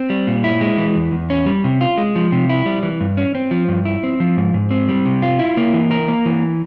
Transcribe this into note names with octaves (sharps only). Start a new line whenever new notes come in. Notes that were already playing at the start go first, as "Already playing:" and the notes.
Already playing: C4
G3
A#2
E4
G#3
E3
E2
E2
C#4
G3
C3
F4
G#3
F3
C3
E4
G3
E3
G2
C#4
C4
F3
G2
E4
C4
F3
G#2
G#2
C4
G3
C3
F4
E4
A#3
E3
A#4
A#3
E3